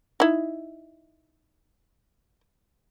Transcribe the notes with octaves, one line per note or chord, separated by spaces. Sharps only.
D#4 E4